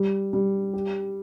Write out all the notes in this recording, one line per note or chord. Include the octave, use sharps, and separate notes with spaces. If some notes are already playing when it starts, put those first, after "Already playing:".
Already playing: G3
G3
G4